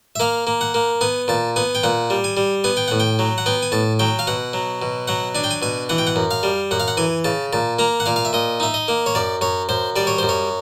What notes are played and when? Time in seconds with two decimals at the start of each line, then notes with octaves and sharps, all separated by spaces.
0.16 E5
0.20 A#3 F5
0.47 A#3
0.61 F#5
0.74 A#3
1.01 B3 G#5
1.28 A#2 A5
1.56 B3 G#5
1.75 G5
1.83 A#2 F#5
2.10 G3
2.24 G#5
2.37 G3
2.64 B3 G#5
2.77 G5
2.88 A2 F#5
3.00 G5
3.19 F#3
3.38 F#5
3.46 B3 G5
3.62 G#5
3.72 A2 A5
3.99 F#3 G5
4.19 F5
4.27 B2 F#5
4.53 F#3
4.82 B2
5.08 F#3 F#5
5.35 D4 G#5
5.44 G5
5.51 G#5
5.62 B2 G#5
5.89 E3 F#5
5.98 G5
6.07 F#5
6.16 F#2
6.31 F5
6.43 G3
6.71 F#2 F#5
6.80 F5
6.88 F#5
6.97 E3 G#5
7.24 C#3 A5
7.53 A#2 A5
7.79 A#3 A#5
8.00 F#5
8.06 A#2 F5
8.16 F5
8.25 E5
8.33 A#2 D#5
8.60 D#4 E5
8.74 D#5
8.88 A#3
9.06 C#5
9.15 F#2 D5
9.41 F#2 C#5
9.69 F#2 C5
9.96 G3 D5
10.07 C#5
10.18 F#2 C5
10.29 C#5